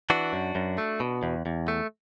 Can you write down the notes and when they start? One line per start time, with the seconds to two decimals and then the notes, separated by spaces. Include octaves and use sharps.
0.10 E3 D4 F#4
0.33 F#2
0.55 F#2
0.78 A3
1.00 B2
1.23 E2
1.46 E2
1.68 A3